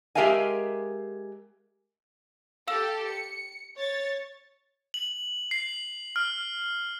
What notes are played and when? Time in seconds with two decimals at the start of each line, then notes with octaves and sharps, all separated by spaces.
0.15 G#3 G4 A#4 E5 F5 G#5
2.68 G4 A4 F5 E6 E7
3.08 C#7
3.79 C#5 A6
4.94 F#7
5.51 C7
6.16 F6